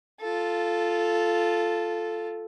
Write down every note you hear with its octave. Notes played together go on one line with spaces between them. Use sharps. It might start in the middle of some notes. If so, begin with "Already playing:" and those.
F4 A4